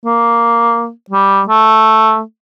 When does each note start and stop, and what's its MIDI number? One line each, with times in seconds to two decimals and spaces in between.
0.05 0.90 58
1.10 1.42 55
1.49 2.21 57